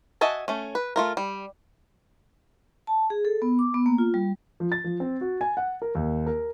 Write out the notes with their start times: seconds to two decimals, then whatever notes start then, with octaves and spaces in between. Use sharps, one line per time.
0.21 F#4 D#5 E5 G#5 A5
0.48 A3 C#4
0.75 B4
0.96 A3 F4 A#4
1.17 G3
2.87 A5
3.10 G#4
3.25 A4
3.42 B3
3.59 D6
3.74 B3
3.86 A#3
3.98 F4
4.14 G3
4.60 F3
4.72 A6
4.84 F3
5.00 C4
5.21 F#4
5.41 G#5
5.57 F#5
5.82 A#4
5.95 D#2
6.26 A#4